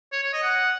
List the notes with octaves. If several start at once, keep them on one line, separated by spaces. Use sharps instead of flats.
C#5
C#5
D#5
F#5